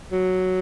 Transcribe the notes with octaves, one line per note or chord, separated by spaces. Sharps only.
F#3